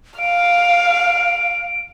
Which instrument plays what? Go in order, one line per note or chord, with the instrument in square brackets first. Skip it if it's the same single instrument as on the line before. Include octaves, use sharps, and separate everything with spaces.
[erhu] F5 [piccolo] D7